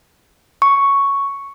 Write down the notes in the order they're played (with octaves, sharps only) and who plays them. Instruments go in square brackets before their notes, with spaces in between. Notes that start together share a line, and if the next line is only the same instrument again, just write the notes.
[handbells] C#6